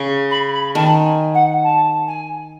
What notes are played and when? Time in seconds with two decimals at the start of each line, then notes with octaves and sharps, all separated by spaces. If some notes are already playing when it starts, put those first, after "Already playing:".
Already playing: C#3
0.31 B5
0.53 B5
0.75 D#3 A5
1.05 G#5
1.34 F#5
1.64 A5
2.07 G#5